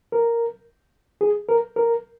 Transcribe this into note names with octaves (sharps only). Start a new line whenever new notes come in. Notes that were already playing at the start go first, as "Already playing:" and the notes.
A#4
G#4
A#4
A#4